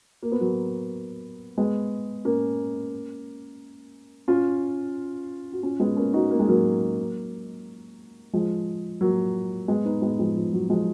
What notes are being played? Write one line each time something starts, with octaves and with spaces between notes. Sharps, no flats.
A#3
B3
F#3 A#3
G#3 B3
A#3 C#4
C#4 F4
F#4
C#4 F4
G#3 B3
A#3 C#4
D#4 F#4
A#3
G#3
F#3 A#3
F3 G#3
F#3 A#3
G#3 B3
B3 D#4
G#3 B3
F3 G#3
F3
F#3
F3 G#3